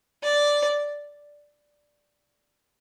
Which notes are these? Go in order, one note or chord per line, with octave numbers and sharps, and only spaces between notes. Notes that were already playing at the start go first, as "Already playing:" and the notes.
D5